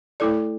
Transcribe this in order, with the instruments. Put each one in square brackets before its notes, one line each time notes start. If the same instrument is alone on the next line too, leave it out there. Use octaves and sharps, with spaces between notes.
[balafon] A3 E4 A4 D5